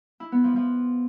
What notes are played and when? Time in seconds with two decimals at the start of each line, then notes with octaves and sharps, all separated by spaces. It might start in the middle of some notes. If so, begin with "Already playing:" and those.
0.20 E4
0.32 B3
0.44 F3
0.56 F3